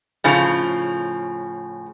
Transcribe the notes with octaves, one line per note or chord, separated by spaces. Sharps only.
A2 C#3 F3